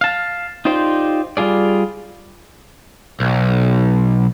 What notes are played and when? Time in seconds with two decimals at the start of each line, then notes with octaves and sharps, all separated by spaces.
0.01 F5 A5
0.65 D#4 F4 G4 C5 D5
1.37 G3 F4 G#4 D5
3.20 B1